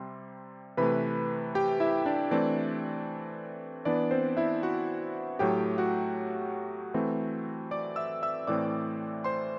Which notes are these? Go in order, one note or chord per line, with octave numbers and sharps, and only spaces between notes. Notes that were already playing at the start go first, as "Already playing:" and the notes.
Already playing: C3 G3 C4 C6
C3 E3 A3 B4 B5
G4 G5
E4 E5
D4 D5
E3 A3 C4 D4 D5
E3 B3 D4 D5
C4 C5
E4 E5
F#4 F#5
A2 F#3 A3 G4 G5
F#4 F#5
E3 A3 C4
D5 D6
E5 E6
E5 E6
A2 E3 A3 C4 D5 D6
C5 C6